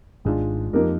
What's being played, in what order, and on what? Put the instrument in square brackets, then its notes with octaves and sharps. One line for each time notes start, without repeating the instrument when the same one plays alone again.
[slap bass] G#1 G#2 [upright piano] G#3 D4 F4
[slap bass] F2 [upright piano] F3 A#3 D#4 G4 A#4